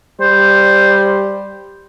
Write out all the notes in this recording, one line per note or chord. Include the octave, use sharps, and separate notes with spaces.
G3 C5